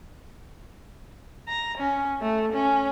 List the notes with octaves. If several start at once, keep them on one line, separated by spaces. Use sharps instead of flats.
A#5
C#4
A3
C#4